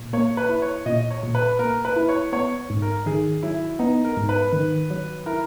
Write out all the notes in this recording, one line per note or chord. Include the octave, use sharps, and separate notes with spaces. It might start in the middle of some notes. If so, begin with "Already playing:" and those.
Already playing: A#2
A#3 C#5
B4
E4
C#5
A#2 D#5
C#5
A#2
B4
A#3 A#4
B4
E4
C#5
B3 C#5
G#2
A#4
D#3 G#4
F#3 E4
B3 D#4
A#4
G#2
B4
D#3
F#3
E4 A#4